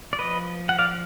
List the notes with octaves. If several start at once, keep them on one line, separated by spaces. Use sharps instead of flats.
D5
F3 B4 D#5
F#5
D5 F5